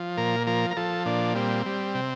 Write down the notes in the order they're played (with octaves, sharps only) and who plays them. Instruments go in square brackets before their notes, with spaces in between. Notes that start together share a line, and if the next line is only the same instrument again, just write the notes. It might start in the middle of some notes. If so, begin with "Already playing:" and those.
Already playing: [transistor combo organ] F3
A#2 A#4
F3 A#4
A#4
F3 A4
A#2 D4
G3 C4
G3
C3